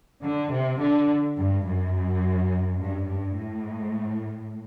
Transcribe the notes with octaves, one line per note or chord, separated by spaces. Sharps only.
D3
C3
D3
G2
F#2
G2
G2
A2